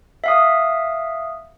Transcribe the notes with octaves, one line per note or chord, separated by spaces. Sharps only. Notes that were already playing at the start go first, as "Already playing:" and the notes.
E5 F5 D#6